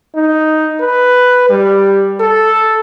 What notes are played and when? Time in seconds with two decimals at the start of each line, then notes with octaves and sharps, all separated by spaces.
0.15 D#4
0.81 B4
1.49 G3
2.20 A4